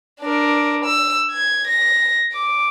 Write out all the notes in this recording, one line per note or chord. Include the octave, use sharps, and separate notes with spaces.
D4 A#4
E6
G#6
A#6
D6